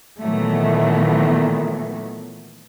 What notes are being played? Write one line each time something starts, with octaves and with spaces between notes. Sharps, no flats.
A#2 D#3 E3 F#3 A3 B3